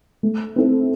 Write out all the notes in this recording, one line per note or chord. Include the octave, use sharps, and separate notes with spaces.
A3
C4 E4 A4